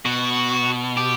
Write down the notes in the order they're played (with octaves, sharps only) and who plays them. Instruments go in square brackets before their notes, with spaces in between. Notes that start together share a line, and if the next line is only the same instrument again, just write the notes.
[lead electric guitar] B2 [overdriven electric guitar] F#4
[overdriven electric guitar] G4